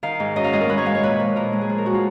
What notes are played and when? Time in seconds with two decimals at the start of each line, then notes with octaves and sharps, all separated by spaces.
0.03 D#3 F5
0.20 G#2
0.36 F#2 D#5
0.44 F5
0.53 G#3 D#5
0.61 A#4
0.69 G#3 B4
0.78 C#5
0.86 G#3 F5
0.95 C#5
1.03 A#2 B4
1.20 F3
1.36 A#2 A#4
1.53 G#3
1.61 G#4
1.70 F3
1.78 A#4
1.86 G#3 F#4
1.94 F4